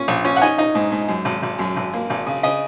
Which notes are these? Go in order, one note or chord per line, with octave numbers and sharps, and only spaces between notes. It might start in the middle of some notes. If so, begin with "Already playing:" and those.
Already playing: A#2 C#4
A#1
C#4
F#5
D#4 G#5
D#4
G#2
G#2
F#2
G#1
G#1
F#2
G#1
A#3
G#1
C#3
C#3 D#5